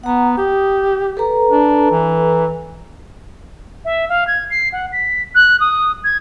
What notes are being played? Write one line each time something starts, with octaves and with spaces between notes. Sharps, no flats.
B3 F#5 A#5
G4 D#6
A4 B4 A#5
D4
E3
E5
F5
G#6
C7
F#5
B6
F#6
D#6
G#6